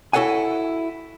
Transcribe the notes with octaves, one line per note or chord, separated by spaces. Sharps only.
E4 F#4 A4 C#5 F#5 G#5